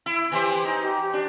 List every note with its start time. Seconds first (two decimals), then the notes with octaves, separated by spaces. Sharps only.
0.06 E4
0.32 E3 G4 C5 G#5
0.65 D#4
0.82 G4
1.13 D4